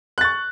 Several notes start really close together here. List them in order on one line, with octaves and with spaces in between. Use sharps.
F#6 A6 C#6